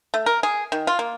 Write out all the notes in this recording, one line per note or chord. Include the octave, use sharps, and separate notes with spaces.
A3
A#4
G#4
D#3
F4
A#3